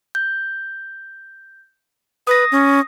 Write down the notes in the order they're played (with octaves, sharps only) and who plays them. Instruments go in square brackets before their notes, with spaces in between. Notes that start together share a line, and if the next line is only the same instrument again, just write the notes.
[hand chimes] G6
[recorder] B4 [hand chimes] D#6 A#6
[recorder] C#4